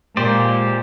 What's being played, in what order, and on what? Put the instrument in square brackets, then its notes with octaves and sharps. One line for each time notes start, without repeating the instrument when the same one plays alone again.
[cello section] A#2 G#3 [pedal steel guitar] G4 C5 D5